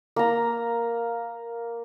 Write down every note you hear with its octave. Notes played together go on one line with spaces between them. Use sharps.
A#3 A#5